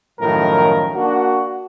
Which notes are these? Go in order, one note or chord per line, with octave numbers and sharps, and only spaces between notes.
F#2 A2 D#3 F3 A#4
A#3 D4 F#4